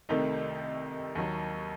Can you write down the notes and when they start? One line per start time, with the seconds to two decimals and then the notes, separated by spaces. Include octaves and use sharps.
0.09 C2 C3 D#3 A3 D#4
1.15 D#2 D#3 F#3